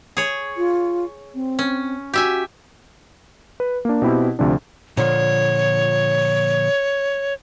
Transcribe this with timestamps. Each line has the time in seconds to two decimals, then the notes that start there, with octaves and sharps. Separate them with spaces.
0.17 G#4 C#5
0.57 F4
1.35 C4
1.59 C#4
2.14 F#4 G4 E5 G#5
3.60 B4
3.85 A#3 D4
4.02 B2 C4 E4 G4
4.39 D2 C3 F3 D4
4.97 A#2 D3 F3 C#5